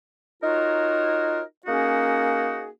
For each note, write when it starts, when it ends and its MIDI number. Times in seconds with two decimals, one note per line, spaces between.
0.42 1.41 63
0.42 1.41 65
0.42 1.41 66
0.42 1.41 70
0.42 1.41 73
1.65 2.68 58
1.65 2.68 61
1.65 2.68 63
1.65 2.68 66
1.65 2.68 68